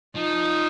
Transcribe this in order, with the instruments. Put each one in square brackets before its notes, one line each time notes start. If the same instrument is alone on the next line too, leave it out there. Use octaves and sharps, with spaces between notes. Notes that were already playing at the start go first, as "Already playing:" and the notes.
[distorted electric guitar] F3 [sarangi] D#4